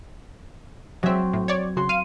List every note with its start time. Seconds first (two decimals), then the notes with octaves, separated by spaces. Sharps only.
1.03 F#3 G#3 C4 E5
1.33 A2
1.48 C#5 D5 G#6
1.77 C#3 F#4 C6
1.89 F5 D#7